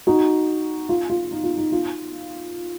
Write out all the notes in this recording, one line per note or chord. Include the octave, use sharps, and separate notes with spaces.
D#4 F#4
F4
F4
D#4
F4
D#4
F4